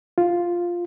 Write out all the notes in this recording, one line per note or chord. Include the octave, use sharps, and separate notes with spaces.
F4